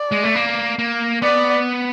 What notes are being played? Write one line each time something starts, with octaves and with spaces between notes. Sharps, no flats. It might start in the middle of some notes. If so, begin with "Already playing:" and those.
Already playing: D5
G#3
A3
A#3
A#3
B3 D5